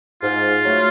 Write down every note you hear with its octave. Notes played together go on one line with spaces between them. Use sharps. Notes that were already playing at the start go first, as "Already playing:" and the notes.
G#2 F4
F#3 A3